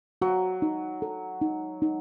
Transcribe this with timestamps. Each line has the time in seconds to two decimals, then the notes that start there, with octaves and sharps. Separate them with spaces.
0.22 F#3 F#4
0.62 D#4
1.02 A4
1.41 D#4
1.82 D#4